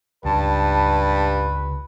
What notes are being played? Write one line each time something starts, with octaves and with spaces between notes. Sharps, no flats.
C#2 G2 B4 A5